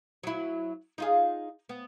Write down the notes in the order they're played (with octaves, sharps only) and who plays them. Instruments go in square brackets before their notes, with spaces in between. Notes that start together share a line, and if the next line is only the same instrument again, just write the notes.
[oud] F#3 E4
D#4 F4 G#4
B3